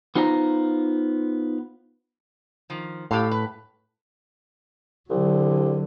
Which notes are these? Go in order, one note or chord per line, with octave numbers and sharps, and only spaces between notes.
B3 D#4 F4 C5 A5 A#5
D#3 F3
A2 G4 A4 F5
B4
C2 D3 F#3